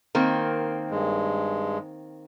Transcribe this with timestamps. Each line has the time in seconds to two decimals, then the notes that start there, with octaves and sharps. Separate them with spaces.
0.15 D#3 A#3 C4
0.91 G2 G#3